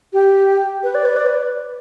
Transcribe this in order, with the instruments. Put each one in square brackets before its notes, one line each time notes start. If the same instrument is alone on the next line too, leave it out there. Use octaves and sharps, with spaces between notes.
[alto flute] G4
B4
D5
B4
D5
B4